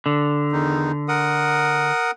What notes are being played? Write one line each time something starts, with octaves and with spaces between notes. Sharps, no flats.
D3
E2 D#3 D#4
A#4 F#5 D#6